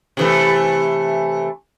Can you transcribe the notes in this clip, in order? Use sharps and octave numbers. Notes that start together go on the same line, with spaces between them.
C3 E3 A3